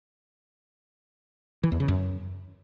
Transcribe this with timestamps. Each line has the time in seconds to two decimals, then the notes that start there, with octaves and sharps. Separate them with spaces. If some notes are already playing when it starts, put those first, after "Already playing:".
1.63 E3
1.72 E2
1.80 C#3
1.88 F#2